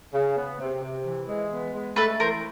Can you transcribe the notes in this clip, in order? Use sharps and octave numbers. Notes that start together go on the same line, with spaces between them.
C#3
B3
C3
C3
E3
G#3
B3
G#3
A3 A4 B4
E3 A#4 C5